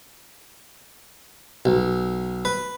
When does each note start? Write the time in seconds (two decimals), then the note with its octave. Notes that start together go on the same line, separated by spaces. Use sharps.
1.65 B1
2.45 B4